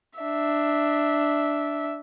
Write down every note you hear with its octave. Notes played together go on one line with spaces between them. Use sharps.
D4 E5